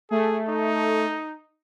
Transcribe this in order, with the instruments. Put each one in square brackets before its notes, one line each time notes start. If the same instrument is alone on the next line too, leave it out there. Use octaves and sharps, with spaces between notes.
[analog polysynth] A3 [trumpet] G#4
[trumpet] D#4